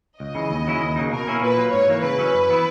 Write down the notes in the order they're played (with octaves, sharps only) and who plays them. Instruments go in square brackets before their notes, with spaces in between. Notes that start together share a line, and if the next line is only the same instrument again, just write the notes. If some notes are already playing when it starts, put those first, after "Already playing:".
[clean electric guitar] C#2 [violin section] D#5
[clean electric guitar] C#3 E3
D#2
C#3 F#3 C#4 E4
D#2
C#3 F#3 A#3 D#4
[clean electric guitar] B2 [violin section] A#4
[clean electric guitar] A#3 C#4 E4
[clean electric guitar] A#2 [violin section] B4
[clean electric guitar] F#3 A#3
[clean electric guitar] G#2 [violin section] C#5
[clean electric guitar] E3 A#3
[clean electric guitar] C#3 [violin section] B4
[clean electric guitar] F#3 C#4 E4
F#2
E3 B3 E4